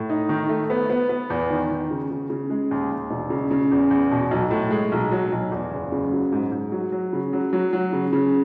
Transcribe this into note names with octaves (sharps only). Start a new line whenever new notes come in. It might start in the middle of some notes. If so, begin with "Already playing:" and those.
Already playing: A2
D#4
D#3
A3
B3
B3
B3
E2
D#3
D#3
C#3
C#3
C#3
G#3
D#2
D#2
E1
C#3
C#3
E2
E2
B2
B1
A2
G#3
B1
F#3
B1
E2
F#1
C#3
F#3
G#2
G#2
F#3
F#3
C#3
F#3
F#3
F#3
C#3
C#3